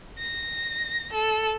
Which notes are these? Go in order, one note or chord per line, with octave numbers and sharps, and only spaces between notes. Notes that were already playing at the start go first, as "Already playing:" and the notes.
A#6
A4